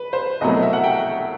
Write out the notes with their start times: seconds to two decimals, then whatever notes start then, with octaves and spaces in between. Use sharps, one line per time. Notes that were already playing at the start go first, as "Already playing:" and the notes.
Already playing: B4
0.13 C5
0.41 C2 B2 F#3 A3 D#5
0.62 E5
0.73 F#5
0.84 G5